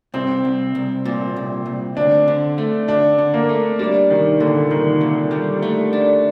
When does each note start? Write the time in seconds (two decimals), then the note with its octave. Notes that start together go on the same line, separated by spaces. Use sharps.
0.14 C2 C4
0.45 C2
0.75 C2
1.05 A#2
1.36 C2
1.66 C2
1.97 D2 D4
2.28 D3
2.58 A3
2.88 D3 D4
3.18 D3
3.34 A#3
3.49 A3
3.79 G3 D4
4.10 C2 D#3
4.40 A#2 D3
4.71 C2 D#3
5.01 A#2
5.31 G3
5.62 A3
5.93 D4